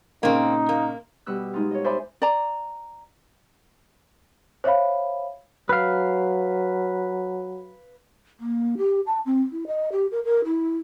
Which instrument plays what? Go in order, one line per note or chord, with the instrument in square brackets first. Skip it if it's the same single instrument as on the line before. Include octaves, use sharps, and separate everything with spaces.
[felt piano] A#2 C#3 C#4 [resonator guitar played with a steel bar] A#3 C4 [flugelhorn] D#4
[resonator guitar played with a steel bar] A#3
[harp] B2 G3 G4 E6 F#6
G#3 D#4 F4
C#5 D#5
C5 D5 E5 G#5 B5 D6
[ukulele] D5 A#5
[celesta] C5 C#5 E5 F5 B5
[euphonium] F#3 [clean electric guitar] B4 F5
[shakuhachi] A#3
G4
A5
C4
E4
D#5
G4
A#4
A#4
E4